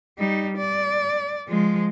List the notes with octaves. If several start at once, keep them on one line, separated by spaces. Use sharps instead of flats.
G3 D#4
D5
F3 G#3